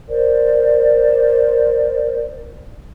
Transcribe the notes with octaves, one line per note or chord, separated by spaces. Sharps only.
A#4 C5 D5